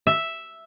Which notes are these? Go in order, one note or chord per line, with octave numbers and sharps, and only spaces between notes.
E5